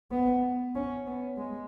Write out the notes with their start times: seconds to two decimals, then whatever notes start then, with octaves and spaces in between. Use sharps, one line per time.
0.11 B3
0.75 C#4
1.07 B3
1.37 G#3